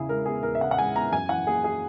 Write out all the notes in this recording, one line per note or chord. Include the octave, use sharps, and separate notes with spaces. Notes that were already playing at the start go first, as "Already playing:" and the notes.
Already playing: E2 C#3 E4 G#4
G#3 A#4
B3 G#4
E2 A#4
E5
C#3 F#5
F#5
G#3 G#5
B3 A#5
F#2 G#5
E3 F#5
A#3 G#4
G#4